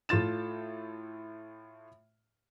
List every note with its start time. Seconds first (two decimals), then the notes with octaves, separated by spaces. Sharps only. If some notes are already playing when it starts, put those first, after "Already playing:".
0.09 A2 A3 F4 A6 E7